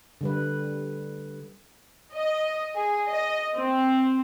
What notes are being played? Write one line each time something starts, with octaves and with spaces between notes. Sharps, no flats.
D3 G3 B4
D#5
G#4
D#5
C4